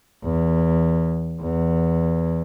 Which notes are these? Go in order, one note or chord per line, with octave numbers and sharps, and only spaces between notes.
E2
E2